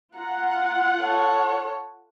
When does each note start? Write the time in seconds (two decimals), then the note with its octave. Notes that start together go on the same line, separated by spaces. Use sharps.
0.16 F4 F#5 A#5
1.01 A4 C#5